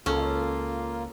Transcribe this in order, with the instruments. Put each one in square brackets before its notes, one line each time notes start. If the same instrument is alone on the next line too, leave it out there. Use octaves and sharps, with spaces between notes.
[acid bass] C#2 [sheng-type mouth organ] A#3 F4 [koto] C#4 [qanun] A4